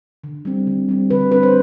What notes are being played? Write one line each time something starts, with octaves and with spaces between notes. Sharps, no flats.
D3
G3 C4
D3
G3 C4
D3 B4
G3 C4 B4
C5